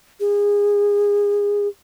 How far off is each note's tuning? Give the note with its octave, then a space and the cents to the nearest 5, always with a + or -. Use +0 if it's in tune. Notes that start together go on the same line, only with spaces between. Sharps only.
G#4 -25